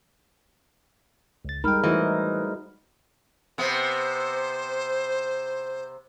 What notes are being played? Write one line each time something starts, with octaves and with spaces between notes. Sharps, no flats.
C#2 A6
G3 G#3 D#4 A#4 G5 B5 F6
E3 A3 D#4 F#4 A#4 C5 D#5
C3 B3 C5